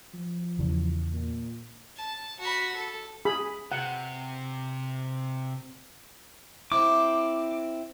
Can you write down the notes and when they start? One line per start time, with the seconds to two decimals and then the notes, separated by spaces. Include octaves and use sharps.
0.14 F3
0.59 E2 C#3 E3
1.12 A#2
1.97 A5
2.40 F#4 B5
2.75 A4
3.25 G#4 B5
3.72 C3 F#5
6.72 C4 E4 D6